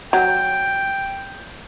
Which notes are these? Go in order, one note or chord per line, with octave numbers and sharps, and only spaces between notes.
F#3 G5